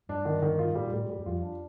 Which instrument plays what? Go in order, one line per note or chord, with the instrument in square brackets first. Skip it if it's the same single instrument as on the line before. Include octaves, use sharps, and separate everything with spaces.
[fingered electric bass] G2 [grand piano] D4
[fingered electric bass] G2 [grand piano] D#3
[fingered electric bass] G2 [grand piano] D#3
[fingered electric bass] G2 [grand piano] F4
[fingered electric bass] A2 [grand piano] G3
[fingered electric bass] A#2
[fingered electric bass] A2 [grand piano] G3
[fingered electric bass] G2 [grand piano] G3
[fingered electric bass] G2
[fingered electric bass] F2 [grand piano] F4
[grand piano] D4